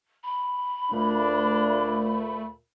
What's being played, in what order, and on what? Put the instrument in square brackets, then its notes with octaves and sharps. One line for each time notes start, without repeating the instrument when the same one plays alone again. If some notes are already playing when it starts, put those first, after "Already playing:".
[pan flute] B5
[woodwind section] D2 A#2 [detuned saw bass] A3 [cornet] D4